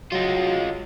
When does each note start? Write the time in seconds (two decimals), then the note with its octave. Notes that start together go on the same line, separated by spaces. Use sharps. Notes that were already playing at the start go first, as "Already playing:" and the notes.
0.12 F#3 G#3 F4